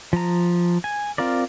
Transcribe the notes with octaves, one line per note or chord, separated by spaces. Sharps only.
F3 A#5
G#5
C4 F4 A#4 D5